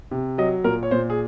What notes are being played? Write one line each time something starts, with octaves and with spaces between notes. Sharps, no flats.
C3
F#3 D#5
A#2 A#4
C#5
A#2 C5
G#4